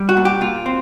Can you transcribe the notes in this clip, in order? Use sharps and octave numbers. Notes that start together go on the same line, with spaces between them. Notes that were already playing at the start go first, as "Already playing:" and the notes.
Already playing: G3
F#4
A#2
G4
A#2 F4
C4